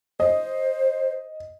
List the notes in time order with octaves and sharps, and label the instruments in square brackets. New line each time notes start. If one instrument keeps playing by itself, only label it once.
[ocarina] C5 [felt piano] D#5